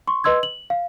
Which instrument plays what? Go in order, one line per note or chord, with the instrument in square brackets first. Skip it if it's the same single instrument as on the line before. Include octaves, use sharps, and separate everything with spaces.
[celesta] C6 C#6
B4 D#5 C6 E6 G#6
F#7
F5